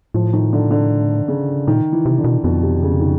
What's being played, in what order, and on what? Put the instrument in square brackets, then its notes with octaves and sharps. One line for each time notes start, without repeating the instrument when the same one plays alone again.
[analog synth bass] A2 [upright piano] F3
[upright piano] D#3
D3
D3
C#3
[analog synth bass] A#2 [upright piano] D#3
[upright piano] E3
[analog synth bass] C3
[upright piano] D3
[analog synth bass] B2
[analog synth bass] F2 [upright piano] B2
[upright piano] C3
C#3
D#3